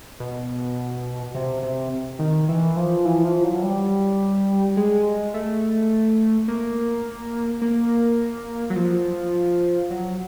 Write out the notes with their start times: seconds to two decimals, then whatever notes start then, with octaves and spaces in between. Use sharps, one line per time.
0.20 B2
1.35 C3
1.63 C3
2.19 D#3
2.49 E3
2.77 F3
3.05 E3
3.24 F3
3.44 F#3
3.63 G3
4.77 G#3
5.34 A3
6.48 A#3
7.62 A#3
8.70 F#3
8.76 F3
9.90 F#3